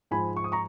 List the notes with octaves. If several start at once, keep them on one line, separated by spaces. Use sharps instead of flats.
G#2 F3 G#3 G#5 B5
C#6
D#6
A#5 C#6